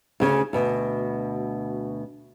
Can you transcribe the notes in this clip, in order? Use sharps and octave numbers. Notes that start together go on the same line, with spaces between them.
D2 C#3 C#4
D2 B2